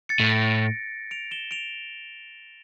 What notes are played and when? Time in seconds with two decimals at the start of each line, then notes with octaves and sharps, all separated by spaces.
0.09 A6 C#7
0.20 A2
0.30 A#6 D7
1.11 D7 F7
1.31 E7 G7
1.51 D7 F7